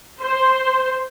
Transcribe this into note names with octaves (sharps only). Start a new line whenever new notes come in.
C5